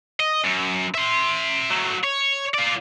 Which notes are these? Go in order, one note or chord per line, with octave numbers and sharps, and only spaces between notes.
D#5
F#2
E5 C6
F#3 A3
C#5
F4 D5